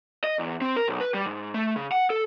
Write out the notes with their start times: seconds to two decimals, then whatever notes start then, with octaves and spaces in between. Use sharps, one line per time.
0.24 D#5
0.39 E2
0.62 C4
0.76 A#4
0.88 B1
1.01 B4
1.14 G3
1.26 G#2
1.54 A3
1.76 C#3
1.92 F#5
2.10 A4